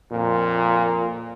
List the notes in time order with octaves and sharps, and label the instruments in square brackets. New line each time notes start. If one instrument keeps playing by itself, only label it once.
[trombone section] F2 A#2